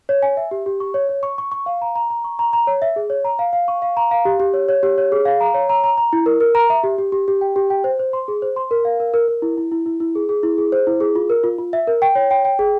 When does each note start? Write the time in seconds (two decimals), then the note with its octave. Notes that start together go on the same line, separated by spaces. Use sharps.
0.09 C#5
0.23 G#5
0.37 E5
0.51 G4
0.66 G4
0.80 C#6
0.94 C#5
1.09 C#5
1.23 C#6
1.38 C#6
1.52 C#6
1.66 F5
1.81 A#5
1.95 A#5
2.10 A#5
2.24 C#6
2.39 A#5
2.53 A#5
2.67 C#5
2.82 E5
2.96 G#4
3.10 C#5
3.25 A#5
3.39 F5
3.53 F5
3.68 C#6
3.82 F5
3.97 A#5
4.11 F5
4.25 G4
4.40 G4
4.53 C#5
4.69 C#5
4.83 G4
4.98 C#5
5.12 G#4
5.25 F5
5.41 A#5
5.54 C#5
5.69 A#5
5.84 A#5
5.98 A#5
6.13 E4
6.26 A#4
6.40 A#4
6.55 A#5
6.70 E5
6.83 G4
6.98 G4
7.12 G4
7.28 G4
7.41 G5
7.56 G4
7.70 G5
7.84 C5
7.99 C5
8.13 C6
8.28 G#4
8.42 C5
8.56 C6
8.71 A#4
8.85 F5
9.00 A#4
9.14 A#4
9.28 A#4
9.42 E4
9.57 E4
9.72 E4
9.86 E4
10.00 E4
10.15 G#4
10.29 G#4
10.43 E4
10.58 G#4
10.72 C5
10.87 E4
11.00 G#4
11.16 F4
11.30 A#4
11.44 F4
11.58 F4
11.73 E5
11.87 A#4
12.02 G5
12.15 C#5
12.31 G5
12.45 G5
12.59 G#4